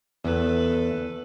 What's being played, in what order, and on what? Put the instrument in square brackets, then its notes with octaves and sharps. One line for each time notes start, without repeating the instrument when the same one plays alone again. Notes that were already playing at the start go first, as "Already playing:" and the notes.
[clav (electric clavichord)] E2 [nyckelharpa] A4 B4